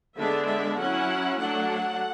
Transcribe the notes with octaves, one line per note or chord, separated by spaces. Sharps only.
D3 G#3 B3 D4 E5
E5
F#3 C#4 E4 F#5
F#3 A3 D4 F#5